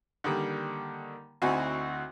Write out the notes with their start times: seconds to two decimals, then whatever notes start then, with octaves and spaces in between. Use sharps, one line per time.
0.24 D3 D#3 G3 A#3
1.42 D2 C4 D#4 E4 F#4 G#5